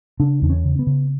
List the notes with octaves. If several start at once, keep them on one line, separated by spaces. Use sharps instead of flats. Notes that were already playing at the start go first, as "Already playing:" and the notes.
C#3 D4
E2 D4
C#4
C#3
B3
C#3